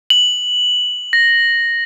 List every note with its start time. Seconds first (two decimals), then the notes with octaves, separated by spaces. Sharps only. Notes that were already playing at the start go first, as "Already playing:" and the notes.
0.10 F#7
1.13 A#6